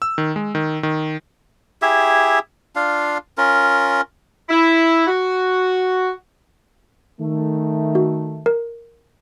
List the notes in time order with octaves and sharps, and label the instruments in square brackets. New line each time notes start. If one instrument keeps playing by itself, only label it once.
[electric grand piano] E6
D#3
G#3
D#3
D#3
[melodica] E4 G4 G#4 E5
D4 F4 F5
C#4 F4 A#4
[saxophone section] E4
F#4
[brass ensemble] D#3 A3
[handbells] F#4
A#4